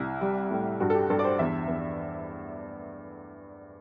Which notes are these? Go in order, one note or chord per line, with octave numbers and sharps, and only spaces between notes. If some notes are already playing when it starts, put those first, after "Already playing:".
Already playing: C2 E4
G3
A2
G2 F#4
A4
G4
G2 A4
D5
C5
E2 E5
E2